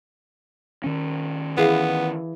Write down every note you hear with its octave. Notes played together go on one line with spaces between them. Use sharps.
D#3 C#4
E3 B3 G#4 F5